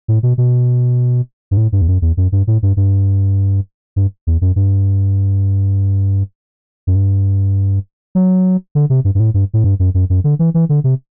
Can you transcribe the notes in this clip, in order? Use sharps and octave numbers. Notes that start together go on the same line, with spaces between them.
A2
B2
B2
G2
A2
G2
E2
F#2
E2
F#2
G2
A2
G2
G2
G2
E2
F#2
G2
F#2
G2
F#3
D3
C3
G2
G2
A2
G2
A2
G2
F#2
F#2
F#2
D3
E3
E3
D3
C3